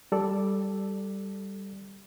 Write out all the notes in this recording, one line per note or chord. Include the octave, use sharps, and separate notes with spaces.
G3 A4 D5